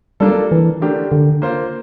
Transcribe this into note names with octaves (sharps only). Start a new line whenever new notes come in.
G3 A#3 D4 F4 A4
E3
D3 A3 D4 G4 A#4
D3
A#3 F4 C5